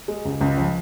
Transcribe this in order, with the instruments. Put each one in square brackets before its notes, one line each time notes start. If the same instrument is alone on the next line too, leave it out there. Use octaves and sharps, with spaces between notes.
[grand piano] G#3
C#2
C#2
F3